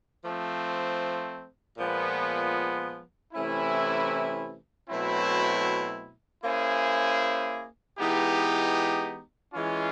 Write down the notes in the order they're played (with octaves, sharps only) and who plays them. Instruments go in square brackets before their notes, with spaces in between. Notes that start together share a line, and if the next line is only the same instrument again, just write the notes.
[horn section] F3 A3 C4
A#2 F3 G#3 B3
C3 E3 A3 C#4 E4
B2 F#3 A3 C4 E4
A#3 C#4 E4 G#4 C5
E3 G#3 B3 D#4 G4
E3 G#3 C#4 F4